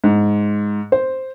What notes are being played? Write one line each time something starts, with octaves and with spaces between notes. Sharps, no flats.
G#2
C5